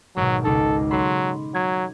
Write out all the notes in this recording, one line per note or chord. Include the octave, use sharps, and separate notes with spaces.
G#1 B2 F#3
C#2 D#4 A4
F#3 A4 B5 C6
F#3 G#6